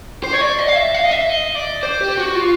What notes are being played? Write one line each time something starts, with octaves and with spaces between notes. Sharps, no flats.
C5
C#5
D5
D#5
F5
E5
F5
D#5
E5
D#5
D5
C5
G4
F#4
F4